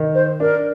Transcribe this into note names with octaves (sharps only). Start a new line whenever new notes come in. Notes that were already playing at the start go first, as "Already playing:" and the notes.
Already playing: D#3
C5
D4 A#4